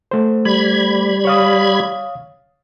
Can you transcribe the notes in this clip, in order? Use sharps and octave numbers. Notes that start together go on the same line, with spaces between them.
A3 C5
G3 B5 G#6
C#5 F5 D#6